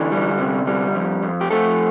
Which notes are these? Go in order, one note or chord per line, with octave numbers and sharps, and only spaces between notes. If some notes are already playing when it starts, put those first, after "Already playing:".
Already playing: D3 E3 D4
G3
C3
G3
F2
F2
G4
F2 A3 A4